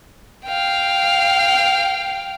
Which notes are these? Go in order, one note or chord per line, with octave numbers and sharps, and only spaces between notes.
F5 G5